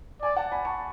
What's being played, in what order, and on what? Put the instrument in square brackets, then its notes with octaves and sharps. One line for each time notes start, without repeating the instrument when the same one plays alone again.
[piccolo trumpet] D5 [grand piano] G#5
[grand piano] F#5 A5
G#5 B5
A5 C#6